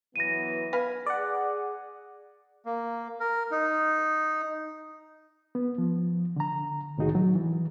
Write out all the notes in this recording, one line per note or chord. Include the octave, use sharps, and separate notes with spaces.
E3 F#3 B3 A#6 D#7
B4 F5 G#5
G#4 D5 F#5
A#3
A#4
D#4
B3
F3
D3 A#5
C2 A2 D#3 D#4 F#4 G#4
F#3
E3